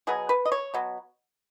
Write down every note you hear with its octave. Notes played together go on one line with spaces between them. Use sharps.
B2 F#3 B3 G#4
B4
D#5
C#5
B2 F#3 B3